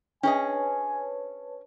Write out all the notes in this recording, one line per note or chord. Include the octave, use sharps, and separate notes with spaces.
C#4 D4 G#4 B4 C#5 D#5 G#5 A5